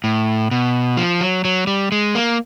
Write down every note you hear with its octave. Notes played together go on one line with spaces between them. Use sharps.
A2
B2
F3
F#3
F#3
G3
G#3
A#3